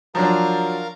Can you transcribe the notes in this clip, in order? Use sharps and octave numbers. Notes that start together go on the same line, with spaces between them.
F3 F#3 D4 A#4 F5 A#5